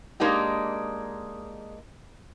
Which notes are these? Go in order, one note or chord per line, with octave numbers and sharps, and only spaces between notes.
G#3 A#3 D4 D#4 G4